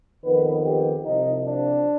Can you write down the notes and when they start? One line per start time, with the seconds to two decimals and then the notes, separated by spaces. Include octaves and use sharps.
0.24 F2 D#3 B3 B4
0.66 G4
1.06 C2 C3 F3 D#4
1.46 D4